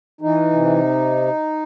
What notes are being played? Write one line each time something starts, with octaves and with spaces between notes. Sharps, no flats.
E3 D#4
C3